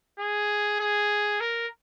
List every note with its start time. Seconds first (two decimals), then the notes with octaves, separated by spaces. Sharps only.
0.19 G#4
0.80 G#4
1.40 A#4